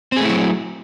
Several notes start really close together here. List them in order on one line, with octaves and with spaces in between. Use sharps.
C4 G#4 A3 E4 F#3